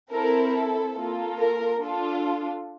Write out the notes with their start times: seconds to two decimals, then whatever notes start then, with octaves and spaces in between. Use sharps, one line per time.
0.12 C4 E4 A4 A#4
0.55 A4
0.96 A#3 F4 A4
1.39 A#4
1.80 D4 F4 A4